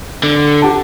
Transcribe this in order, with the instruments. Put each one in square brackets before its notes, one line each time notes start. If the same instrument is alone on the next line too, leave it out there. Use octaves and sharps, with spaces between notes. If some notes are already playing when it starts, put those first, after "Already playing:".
[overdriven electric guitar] D3
[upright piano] G4 F#5 A5